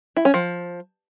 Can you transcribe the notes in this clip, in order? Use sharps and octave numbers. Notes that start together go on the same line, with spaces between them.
E4
C#4
F3